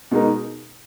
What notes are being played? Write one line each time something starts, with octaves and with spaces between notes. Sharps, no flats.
B2 G#3 D#4 A#4